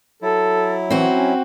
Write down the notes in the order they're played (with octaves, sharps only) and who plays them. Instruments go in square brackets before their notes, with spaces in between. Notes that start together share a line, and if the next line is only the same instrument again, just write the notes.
[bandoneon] F#3 E4 [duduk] A4
[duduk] E3 [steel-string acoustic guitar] C4 F#4
[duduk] C#4